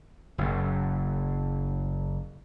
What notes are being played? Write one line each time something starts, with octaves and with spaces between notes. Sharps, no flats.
F#1 F#2